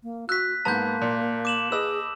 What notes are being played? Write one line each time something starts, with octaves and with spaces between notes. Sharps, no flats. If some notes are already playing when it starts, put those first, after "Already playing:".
A#3
F#4 E6 F#6 B6
G#2 A#3 B3 A5 A#5 G6
A#2
D6 E7 F#7
G#4 B4 D#5 D6 E6